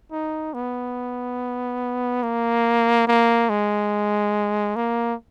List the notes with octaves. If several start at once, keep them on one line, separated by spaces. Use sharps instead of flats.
D#4
B3
A#3
A#3
G#3
A#3